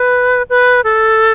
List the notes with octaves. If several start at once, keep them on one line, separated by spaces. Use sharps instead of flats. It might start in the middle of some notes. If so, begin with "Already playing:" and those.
Already playing: B4
B4
A4